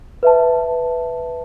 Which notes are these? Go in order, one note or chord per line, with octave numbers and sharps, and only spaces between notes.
B4 E5 A5